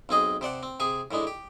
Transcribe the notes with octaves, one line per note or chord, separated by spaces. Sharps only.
B1 C4 G#4 D#5
C3 C5 D5 F#5
C4
C3 G#4 G#5
A2 E3 G#3 D4
G4